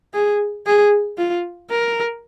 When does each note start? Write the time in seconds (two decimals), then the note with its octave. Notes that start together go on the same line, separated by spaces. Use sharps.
0.14 G#4
0.66 G#4
1.18 F4
1.70 A#4